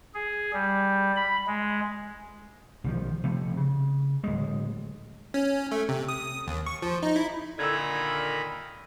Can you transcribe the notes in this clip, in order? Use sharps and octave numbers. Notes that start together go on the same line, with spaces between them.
G#4
G3
B5
G#3
B1 D#3 F3
C3 F3 A3
C#3
D1 G#3
C#4
A3
C3
D#6
D#2
C#6
F3
D#4
E4
A#2 D3 D#3 A#5 B5 E6 G#6